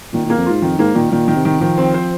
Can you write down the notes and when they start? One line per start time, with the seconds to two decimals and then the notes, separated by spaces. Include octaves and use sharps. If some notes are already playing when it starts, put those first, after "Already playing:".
0.13 A#2 D#3
0.26 A#2 A#3
0.38 F2
0.46 G#2 F4
0.62 F2 D#3
0.78 G#2 A#3
0.95 A#2 D#3
1.11 A#2 D#3
1.28 D#3
1.36 C3
1.45 D#3
1.60 D#3 F3
1.78 C4
1.94 C5